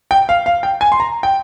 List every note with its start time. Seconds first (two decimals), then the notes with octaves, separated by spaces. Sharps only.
0.11 G5
0.29 F5
0.46 F5
0.63 G5
0.81 G#5
0.92 C6
1.00 A#5
1.23 G5